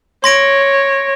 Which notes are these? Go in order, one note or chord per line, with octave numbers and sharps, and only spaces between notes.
C#5 C6 A#6 D7